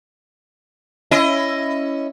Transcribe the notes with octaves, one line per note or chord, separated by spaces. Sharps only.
C#4 E4 D#5